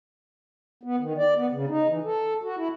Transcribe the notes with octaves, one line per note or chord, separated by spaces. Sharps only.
B3
D#3
D5
B3
C#3
D#4
E3
A4
F#4
E4